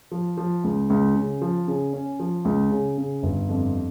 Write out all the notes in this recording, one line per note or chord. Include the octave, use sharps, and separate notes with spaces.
F3
F3
C#2
C#2
C#3
F3
C#3
C#4
F3
C#2
C#3
C#3
G1
F2